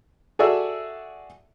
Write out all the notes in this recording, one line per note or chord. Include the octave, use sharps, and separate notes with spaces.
F#4 G#4 A4 D5 E5 E6